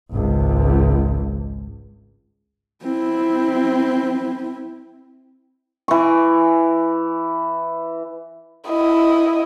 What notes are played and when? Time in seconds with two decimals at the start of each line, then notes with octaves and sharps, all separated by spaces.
0.11 G#1 C#2
2.83 C4 E4
5.88 E3 C#6
8.68 E4 D#5